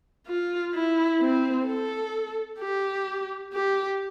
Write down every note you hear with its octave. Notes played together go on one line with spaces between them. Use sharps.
F4
E4
C4
A4
G4
G4